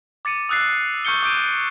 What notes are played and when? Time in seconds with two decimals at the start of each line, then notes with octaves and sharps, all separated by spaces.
0.25 D6 A6 C#7 D#7
0.49 D#6 E6 F#6 A6 C7
1.05 C#6 F6 G6 C#7 G7
1.23 D6 G6 D7 D#7